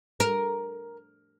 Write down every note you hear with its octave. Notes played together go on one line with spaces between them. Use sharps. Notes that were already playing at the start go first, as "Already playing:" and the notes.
A#4